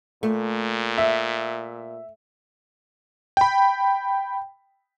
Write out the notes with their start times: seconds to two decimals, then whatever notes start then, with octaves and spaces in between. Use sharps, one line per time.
0.23 A#2 A3
0.98 E5
3.37 G5 B5